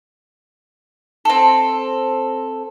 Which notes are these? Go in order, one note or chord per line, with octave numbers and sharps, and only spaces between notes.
C4 A4